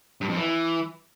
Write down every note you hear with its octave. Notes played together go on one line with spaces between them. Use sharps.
G2
F2
E3